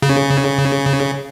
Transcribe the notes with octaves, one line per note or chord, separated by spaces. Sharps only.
C#3